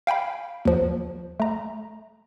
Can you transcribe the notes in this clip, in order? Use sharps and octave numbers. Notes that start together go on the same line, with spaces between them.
F5 G5 G#5 B5
D#2 F3
A3 A#5